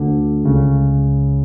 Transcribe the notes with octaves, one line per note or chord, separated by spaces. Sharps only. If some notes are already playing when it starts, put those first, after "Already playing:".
Already playing: D2 D3
C#2 C#3